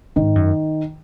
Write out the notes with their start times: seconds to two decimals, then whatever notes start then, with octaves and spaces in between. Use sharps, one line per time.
0.16 G#2 D#3
0.35 F#2